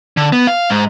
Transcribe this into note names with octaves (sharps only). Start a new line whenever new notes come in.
D3
B3
F5
G#2